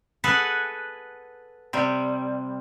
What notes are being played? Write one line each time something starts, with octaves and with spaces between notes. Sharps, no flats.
G#4 A4 B4 F#5 G#5
C3 G3